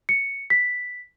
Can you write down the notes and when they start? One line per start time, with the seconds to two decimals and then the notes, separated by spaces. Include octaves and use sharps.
0.09 C#7
0.50 B6